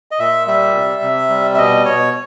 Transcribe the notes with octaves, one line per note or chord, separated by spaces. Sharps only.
D#5
A#2 E5
G3 E5
C3
C3
G3
E5
B2 D#5
B2 C#5